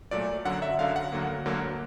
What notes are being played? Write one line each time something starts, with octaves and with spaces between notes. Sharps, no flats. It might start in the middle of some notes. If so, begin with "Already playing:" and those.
A#2 F#3 A3 D5
F#2 D3 F#3 F#5
E5
F#2 D3 F#3 F5
F#5
D2 D3 F#3 A#3
D2 D3 F#3 A#3